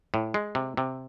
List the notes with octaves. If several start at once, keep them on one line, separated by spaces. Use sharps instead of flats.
A2
G#3
C3
C3